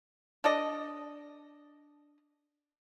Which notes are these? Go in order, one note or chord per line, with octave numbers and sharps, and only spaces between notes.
D4 A4 D5 D#5